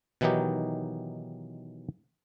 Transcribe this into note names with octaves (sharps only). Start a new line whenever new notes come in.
B2 D#3 E3 F#3 D#4 G4